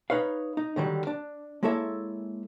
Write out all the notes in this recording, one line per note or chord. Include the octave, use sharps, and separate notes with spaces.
D#4 B4 C#5 F5
D#4
D3 D#3 F#3 G3
D4
G#3 A#3 E4 A4 C#5 E5